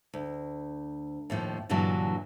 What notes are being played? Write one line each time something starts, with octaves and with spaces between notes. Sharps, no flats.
D2
D#2 A2 D#3 F3
G2 A#2 D3 E3 F#3 A5